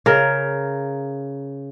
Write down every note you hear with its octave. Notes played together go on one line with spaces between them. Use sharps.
C#3 A#4